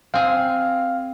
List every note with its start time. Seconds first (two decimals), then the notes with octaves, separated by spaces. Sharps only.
0.14 C4 G#4 F5